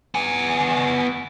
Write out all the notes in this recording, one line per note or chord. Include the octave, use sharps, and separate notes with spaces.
B3 G#5